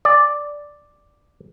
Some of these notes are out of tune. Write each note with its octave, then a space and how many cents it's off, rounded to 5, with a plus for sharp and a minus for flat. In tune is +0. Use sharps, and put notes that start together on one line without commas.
D5 +0 G#5 -25